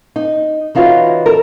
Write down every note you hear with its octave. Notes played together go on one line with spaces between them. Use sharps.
D#4
E3 D#4 F4 F#4 C#5
A4 A#4